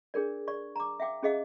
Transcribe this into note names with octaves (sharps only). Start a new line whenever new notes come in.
D4 G#4 A#4 D5
D5 C#6
A#5 D6
E5 F5 G5 D6
C#4 G#4 D#5 F5 D#6